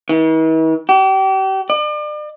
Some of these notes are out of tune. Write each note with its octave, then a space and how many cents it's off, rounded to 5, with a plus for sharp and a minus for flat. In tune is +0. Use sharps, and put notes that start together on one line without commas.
E3 -45
G4 -35
D5 +40